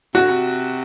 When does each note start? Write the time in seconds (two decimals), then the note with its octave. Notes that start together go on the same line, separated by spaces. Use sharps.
0.14 C3 F#4
0.21 D3
0.30 C3